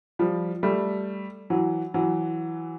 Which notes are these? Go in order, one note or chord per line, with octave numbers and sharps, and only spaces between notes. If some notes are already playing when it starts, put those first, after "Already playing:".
F3 G3
G3 A3
E3 F#3
E3 F#3